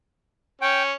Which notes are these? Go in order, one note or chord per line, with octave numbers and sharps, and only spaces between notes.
C#4 G5